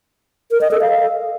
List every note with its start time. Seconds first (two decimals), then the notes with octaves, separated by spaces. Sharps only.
0.51 A#4
0.61 D#5
0.71 A4
0.81 F5